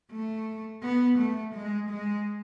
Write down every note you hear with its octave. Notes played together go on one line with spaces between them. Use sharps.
A3
B3
A3
G#3
G#3